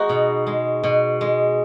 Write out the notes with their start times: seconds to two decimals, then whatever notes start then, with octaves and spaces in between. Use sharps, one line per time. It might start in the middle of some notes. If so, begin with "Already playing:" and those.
Already playing: G#3 B3 D#4 F#4
0.09 B2
0.47 G#3
0.84 B2
1.21 G#3